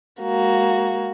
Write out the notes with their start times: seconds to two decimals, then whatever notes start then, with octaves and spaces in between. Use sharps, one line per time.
0.20 G#3 A#3 F#4